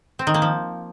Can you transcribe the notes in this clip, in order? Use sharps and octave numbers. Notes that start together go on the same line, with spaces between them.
C4
D#3
A#3
F3